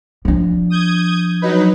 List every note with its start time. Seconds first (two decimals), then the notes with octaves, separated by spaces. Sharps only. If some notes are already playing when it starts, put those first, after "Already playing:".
0.25 F3 D4
0.70 D#6 G6 G#6
1.42 F#3 D#4 B4